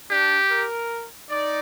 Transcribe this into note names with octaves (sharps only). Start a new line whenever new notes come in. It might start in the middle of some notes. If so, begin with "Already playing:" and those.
D4 G4
A#4
D#4 D5